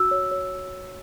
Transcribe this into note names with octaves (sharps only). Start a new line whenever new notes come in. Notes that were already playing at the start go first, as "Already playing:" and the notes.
Already playing: F#4 E6
C#5
C#5